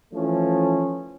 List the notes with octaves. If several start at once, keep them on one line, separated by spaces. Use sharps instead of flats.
E3 F3 A3 C#4